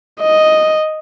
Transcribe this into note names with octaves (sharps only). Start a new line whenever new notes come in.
D#5